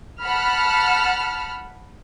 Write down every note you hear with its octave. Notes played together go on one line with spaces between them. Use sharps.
F#5 A5 B5 F6